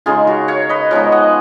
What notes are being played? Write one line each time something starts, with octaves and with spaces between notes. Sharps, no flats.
C#3 G#3 D#4 F4 G#4
F#4 A#4
C#5 F5
B4 D#5
F3 G#3 B3 D#4 A#4 C#5
D#5 F#5